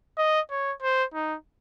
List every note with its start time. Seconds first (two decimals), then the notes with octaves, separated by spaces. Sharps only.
0.18 D#5
0.51 C#5
0.82 C5
1.14 D#4